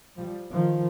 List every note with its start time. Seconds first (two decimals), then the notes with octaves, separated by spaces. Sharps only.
0.17 F3 G3
0.52 D#3 F3